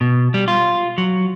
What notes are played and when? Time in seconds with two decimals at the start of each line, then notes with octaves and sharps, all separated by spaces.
0.01 B2
0.34 G3
0.48 F4
0.98 F#3